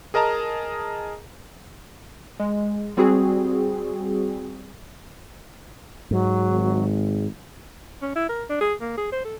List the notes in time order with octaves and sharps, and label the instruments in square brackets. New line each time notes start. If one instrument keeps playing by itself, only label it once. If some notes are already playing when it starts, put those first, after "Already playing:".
[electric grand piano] G#4 A#4 D#5 A5 A#5
[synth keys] G#3
G3 C4 F#4 G#4
[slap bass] G#2 [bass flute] F#3
[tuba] G#1
[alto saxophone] C#4
E4
A#4
D4
G#4
A#3
G#4
C5
A4